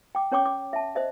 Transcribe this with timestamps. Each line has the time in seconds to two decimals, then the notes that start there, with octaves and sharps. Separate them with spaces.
0.15 G5 D6
0.32 C#4 C#5 G5 C#6 D6
0.46 D6
0.73 E5 A5
0.95 C5 D#5 E5